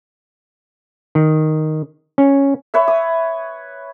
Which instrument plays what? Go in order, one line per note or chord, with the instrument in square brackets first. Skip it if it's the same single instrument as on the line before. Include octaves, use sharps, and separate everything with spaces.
[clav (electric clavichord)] D#3
C#4
[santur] B4 C#5 E5
D#6